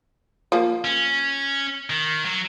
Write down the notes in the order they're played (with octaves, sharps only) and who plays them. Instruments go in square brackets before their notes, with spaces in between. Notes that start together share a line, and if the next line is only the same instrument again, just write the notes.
[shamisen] F3 A#3
[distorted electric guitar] C#4
D#3
F#3